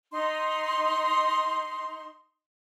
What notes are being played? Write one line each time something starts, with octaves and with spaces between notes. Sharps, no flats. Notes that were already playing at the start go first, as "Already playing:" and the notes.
D#4 C6